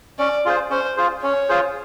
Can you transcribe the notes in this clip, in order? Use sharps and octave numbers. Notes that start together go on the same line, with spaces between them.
C#4 D5
F4 G#4 C5
C#4 C5
F4 G#4 C5
C#4 C#5
F4 G#4 C5